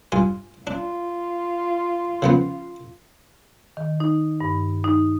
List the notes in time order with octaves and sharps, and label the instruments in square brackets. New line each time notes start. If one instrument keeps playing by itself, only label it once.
[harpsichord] G2 F4 G#5
[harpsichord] D4 [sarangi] F4
[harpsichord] C#3 F3 B3
[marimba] D#3
D#4
G2
D#4